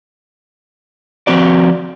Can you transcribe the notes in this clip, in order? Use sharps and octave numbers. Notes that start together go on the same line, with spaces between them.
F3 C4 F#4 D5